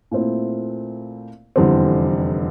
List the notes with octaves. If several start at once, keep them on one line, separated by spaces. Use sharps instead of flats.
A#2 A3 C4 E4
F1 E2 D3 G3 C4